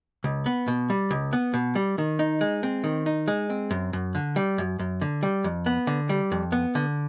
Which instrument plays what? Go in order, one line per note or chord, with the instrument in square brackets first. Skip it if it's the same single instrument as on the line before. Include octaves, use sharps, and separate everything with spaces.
[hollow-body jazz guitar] C#2
B3
B2
G3
C#2
B3
B2
G3
D#3
D#4
G#3
C4
D#3
D#4
G#3
C4
F#2
F#2
D3
G3
F#2
F#2
D3
G3
F2
B3
D3
G3
F2
B3
D3